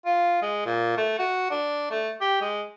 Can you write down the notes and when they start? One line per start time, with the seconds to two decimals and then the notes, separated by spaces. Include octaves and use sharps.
0.06 F4
0.42 G#3
0.66 A#2
0.97 A3
1.19 F#4
1.51 D4
1.91 A3
2.21 G4
2.41 G#3